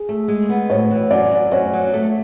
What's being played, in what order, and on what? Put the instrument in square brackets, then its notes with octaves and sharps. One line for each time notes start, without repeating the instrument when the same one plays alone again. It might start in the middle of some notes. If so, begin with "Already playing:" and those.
Already playing: [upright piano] G#4
[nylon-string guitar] A3
G#3
B3
[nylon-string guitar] A2 [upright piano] C#5
[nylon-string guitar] E3
[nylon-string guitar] F#2 [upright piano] D5
[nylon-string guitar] F#2
[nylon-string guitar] F#2 [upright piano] C#5
[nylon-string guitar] F#3
A3